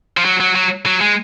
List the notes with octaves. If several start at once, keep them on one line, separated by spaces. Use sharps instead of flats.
F3
F#3
F#3
F#3
F#3
G#3